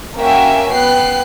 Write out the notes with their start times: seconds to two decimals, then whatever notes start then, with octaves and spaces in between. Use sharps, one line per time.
0.18 A#3 C#4 F#4 E5 G5 G#5
0.72 B3 G5 F#6 C7